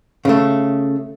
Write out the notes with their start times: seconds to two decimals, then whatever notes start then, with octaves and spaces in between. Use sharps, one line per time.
0.25 C#3 A3